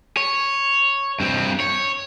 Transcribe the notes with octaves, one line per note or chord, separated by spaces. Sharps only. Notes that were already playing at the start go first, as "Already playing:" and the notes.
C#5
G2 C4
C#5